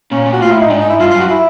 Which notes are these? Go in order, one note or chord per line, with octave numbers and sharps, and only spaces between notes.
A#2 C#4
A#2
F#4
A2 F4
E4
D#4
G#2 D4
D#4
E4
G2 F4
F4
F#2 F#4
E4